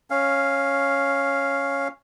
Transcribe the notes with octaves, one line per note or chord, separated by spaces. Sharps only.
C#4 F5